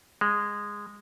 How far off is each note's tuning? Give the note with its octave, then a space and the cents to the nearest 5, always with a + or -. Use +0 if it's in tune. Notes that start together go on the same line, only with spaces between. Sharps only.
G#3 -15